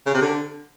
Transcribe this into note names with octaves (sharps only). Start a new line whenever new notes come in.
C#3
C3
D3